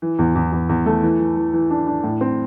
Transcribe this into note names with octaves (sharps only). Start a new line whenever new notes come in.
E3
E2
E2
E2
E2
A3
E3
E3
E3
E3
D4
D4
A2
C4